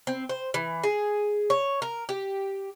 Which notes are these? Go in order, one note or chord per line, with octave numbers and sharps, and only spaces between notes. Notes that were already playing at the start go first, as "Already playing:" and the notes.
C4
C5
E3
G#4
C#5
A#4
G4